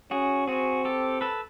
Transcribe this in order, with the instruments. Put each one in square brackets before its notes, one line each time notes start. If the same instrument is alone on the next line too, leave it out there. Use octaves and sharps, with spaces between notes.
[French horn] C#4 [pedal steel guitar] F#4 G#4
[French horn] C4 [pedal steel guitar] F#4 G#4
[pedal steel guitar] G4 A4
A4 B4